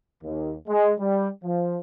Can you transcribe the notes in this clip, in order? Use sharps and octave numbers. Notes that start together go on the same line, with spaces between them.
D#2
G#3
G3
F3